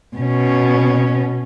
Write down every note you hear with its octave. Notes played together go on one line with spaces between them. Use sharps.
B2 C#4